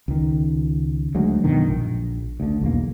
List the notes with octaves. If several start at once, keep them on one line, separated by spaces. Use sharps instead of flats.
C#2 D#3
D2 F#3 G#3
F#2 B2 D3 D#3
A#1
D2 D3
B1 E2 A#3